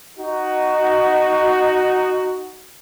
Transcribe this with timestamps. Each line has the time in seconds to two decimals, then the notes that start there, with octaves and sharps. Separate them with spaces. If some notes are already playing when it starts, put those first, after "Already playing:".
0.18 D#4 F#4